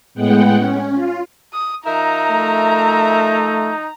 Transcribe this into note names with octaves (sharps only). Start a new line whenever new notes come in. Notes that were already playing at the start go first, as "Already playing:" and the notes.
A2 G#3 B3 F#5 G5
C#4
F4
D#6
F3 D#4 A#4 E5 A#5
A3